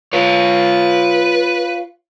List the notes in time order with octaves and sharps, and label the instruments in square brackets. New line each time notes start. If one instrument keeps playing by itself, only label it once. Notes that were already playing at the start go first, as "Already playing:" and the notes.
[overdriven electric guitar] F4 C#5 [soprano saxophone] B4